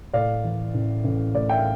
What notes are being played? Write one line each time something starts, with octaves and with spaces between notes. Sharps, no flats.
A2 D5 F5
E3
A1
A1
A2 D5
E5 G5
F5